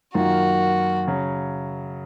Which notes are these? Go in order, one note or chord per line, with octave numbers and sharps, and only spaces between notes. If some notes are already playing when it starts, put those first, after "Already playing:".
F#2 D#3 A#3 F4 F#4
C#3 F#3